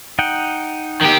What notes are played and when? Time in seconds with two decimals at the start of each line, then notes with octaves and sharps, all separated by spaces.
0.19 D#4 F#5 G5
1.01 D#3 G4